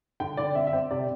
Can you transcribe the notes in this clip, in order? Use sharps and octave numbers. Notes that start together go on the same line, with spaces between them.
D3 G5
D3 D5
C4 E5
E5
C4 G5
C3 D5